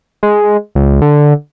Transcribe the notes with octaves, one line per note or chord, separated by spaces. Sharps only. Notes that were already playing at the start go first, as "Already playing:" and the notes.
G#3
C#2
D3